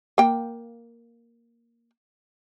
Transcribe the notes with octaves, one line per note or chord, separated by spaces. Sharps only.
A#3 G5